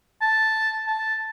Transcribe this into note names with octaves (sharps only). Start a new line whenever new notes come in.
A5
A5